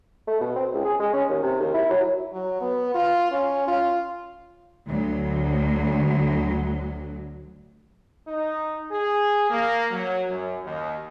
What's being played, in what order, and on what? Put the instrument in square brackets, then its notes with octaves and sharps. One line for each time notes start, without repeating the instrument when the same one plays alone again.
[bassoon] A3
B2
C4
C#2
G#4
G#3
C#4
D#2
C3
D#2
E4
F#3
[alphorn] F#3
B3
F4
C#4
F4
[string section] D2 F#3
[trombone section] D#4
G#4
A#3
F#3
F#2
D#2